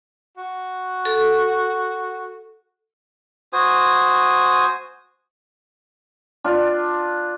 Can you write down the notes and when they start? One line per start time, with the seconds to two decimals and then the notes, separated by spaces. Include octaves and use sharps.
0.37 F#4
1.05 A4
3.53 F#4 C5 G#5 D#6
6.44 D4 F4